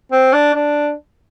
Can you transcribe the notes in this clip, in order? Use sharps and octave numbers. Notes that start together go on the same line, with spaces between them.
C4
D4
D4